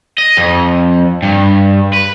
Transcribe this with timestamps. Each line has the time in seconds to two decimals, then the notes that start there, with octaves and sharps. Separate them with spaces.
0.18 D#5
0.37 F2
1.23 G2
1.93 B4